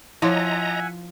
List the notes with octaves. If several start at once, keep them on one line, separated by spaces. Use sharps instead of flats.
F3 E4 C#5 D#5 E5 F#5 G#5 A#5